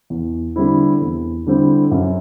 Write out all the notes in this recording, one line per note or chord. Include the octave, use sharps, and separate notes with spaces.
E2
D3 G3 C4 E4
E2
D3 G3 C4 E4
F#2